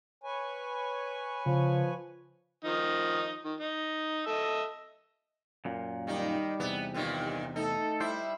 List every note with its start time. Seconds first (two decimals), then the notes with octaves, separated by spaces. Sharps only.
0.24 B4 C#5 G#5
1.46 C#3 F3
2.65 D#3 F3 D#4
3.45 D#3
3.60 D#4
4.26 A4 D#5 E5
5.65 F#2 A#2
6.07 D#3 G3 D#4
6.60 E2 C3 B3
6.94 G2 A#2 D#3
7.56 A3 D#4 A4
8.00 G3 E4 C5